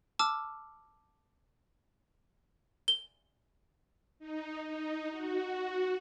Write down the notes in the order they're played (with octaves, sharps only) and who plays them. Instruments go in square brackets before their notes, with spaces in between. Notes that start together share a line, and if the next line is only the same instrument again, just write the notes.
[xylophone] A5 D6 E6 F6
G7
[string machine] D#4
D#4
F#4